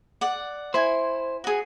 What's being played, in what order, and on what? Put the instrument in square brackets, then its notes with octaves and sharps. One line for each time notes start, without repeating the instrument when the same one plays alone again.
[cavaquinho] D5 F#5
[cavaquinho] E4 G#5 [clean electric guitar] C5
[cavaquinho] F#4 G#4